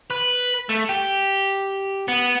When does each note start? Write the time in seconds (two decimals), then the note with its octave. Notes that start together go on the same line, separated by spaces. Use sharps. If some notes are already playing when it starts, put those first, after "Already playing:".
0.10 B4
0.69 A3
0.89 G4
2.08 B3